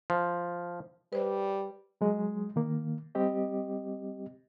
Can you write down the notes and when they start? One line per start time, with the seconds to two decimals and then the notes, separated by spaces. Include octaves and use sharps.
0.10 F3
1.13 G3 B4 C5 D5
2.01 F#3 G#3
2.56 D#3 A#3
3.15 G3 C4 G4 D#5